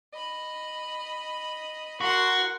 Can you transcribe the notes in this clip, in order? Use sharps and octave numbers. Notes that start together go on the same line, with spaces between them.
D#5 B5
F#4 A#4 C6